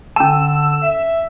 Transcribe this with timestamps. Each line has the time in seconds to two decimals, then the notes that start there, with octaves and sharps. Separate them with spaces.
0.16 D3 C#4 A5 E6
0.83 E5